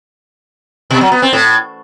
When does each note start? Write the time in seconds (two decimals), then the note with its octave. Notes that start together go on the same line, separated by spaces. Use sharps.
0.90 B2
1.01 F#3
1.12 B3
1.22 C4
1.33 A2